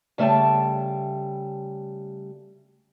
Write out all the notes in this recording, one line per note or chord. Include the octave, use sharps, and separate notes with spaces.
C#3 G3 A3 G5 A5